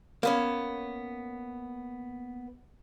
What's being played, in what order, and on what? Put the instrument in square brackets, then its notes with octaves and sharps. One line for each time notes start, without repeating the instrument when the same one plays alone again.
[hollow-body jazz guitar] A#3 B3 C#4